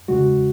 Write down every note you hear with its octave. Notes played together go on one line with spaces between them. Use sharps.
E2 C#3 G#3 F#4